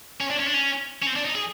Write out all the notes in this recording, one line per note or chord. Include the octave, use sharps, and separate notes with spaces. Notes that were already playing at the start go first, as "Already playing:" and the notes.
C#4
D4
C#4
D4
C#4
C#4
C4
D4
D#4
G#4